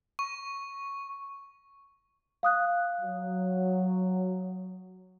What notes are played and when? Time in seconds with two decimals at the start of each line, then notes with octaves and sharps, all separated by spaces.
0.19 C#6
2.43 F5 D#6 F#6
3.01 F#3